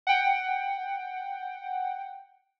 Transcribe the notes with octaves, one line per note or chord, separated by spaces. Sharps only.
F#5 G5